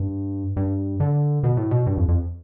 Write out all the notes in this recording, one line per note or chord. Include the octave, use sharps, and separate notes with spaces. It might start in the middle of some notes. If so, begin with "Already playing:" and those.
Already playing: G2
G2
D3
B2
A2
B2
G2
F2
F2